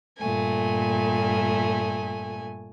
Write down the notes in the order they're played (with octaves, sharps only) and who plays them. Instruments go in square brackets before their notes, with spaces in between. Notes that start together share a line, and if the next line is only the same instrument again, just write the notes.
[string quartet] G2 A#2 A3 G#5